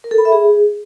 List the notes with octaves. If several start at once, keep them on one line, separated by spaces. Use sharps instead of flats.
A#4
A4
B5
E5
G#4